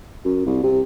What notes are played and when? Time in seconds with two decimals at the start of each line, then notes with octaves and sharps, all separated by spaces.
0.25 F#2
0.46 C2
0.63 C3